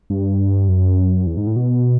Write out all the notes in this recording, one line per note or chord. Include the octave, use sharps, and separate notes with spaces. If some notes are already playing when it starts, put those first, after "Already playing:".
G2
F#2
E2
G#2
A2
B2